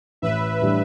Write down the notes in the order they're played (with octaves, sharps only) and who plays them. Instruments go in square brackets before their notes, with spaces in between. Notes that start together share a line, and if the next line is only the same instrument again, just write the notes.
[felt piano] A1 [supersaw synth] B4 E5
[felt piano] A2 E3 G3 D4